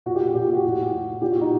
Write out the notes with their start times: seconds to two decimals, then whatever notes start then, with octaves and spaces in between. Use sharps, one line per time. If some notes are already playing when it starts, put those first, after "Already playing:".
0.06 A#2 F#4
0.15 G4
0.35 A#2 G4
0.45 G4
0.54 F#4
0.64 A2
0.92 A2
1.21 A#2 G4
1.31 F#4
1.41 D#4